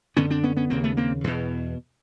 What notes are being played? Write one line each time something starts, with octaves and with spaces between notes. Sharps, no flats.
F#2 D3 B3 C#4
C4 D4
B3 C#4
B3 C#4
D#2 C#3 A#3 C4
A3 B3
A#3 C4
E2 B2